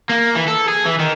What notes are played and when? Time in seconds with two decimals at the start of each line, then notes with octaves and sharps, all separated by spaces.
0.10 A#3
0.35 E3
0.48 A4
0.68 G#4
0.85 E3
0.99 D#3